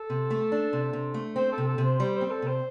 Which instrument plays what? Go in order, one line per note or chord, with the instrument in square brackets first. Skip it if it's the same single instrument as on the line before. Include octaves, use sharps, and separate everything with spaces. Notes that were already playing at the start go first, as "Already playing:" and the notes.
Already playing: [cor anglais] A4
[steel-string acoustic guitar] C3
A3
D4
C3
C3
A3
[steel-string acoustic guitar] C4 [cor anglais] C5
[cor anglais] A4
[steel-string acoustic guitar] C3
[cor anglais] A4
[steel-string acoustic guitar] C3
[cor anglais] C5
[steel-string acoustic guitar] G3 [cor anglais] C5
[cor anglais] C5
[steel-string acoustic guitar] C4
[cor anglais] A4
[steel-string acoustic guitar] C3 [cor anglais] C5